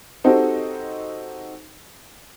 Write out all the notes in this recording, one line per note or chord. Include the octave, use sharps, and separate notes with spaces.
C4 D#4 F#4 G4 A4 C5